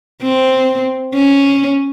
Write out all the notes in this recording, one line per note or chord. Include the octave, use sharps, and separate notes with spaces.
C4
C#4